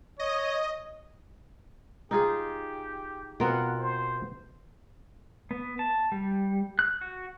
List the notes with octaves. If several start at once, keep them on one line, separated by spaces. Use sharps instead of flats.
C#5 D#5
D#4 F4 G4 G#4
B2 B3 C4 F4 A#4 F#5
C5
B3
A5
G3
F#6
F#4